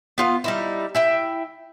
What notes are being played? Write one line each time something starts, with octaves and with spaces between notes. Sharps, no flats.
B3 F4 F5
G3 D#4 E4
E4 E5 G5